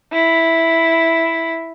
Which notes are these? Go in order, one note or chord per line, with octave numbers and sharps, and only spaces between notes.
E4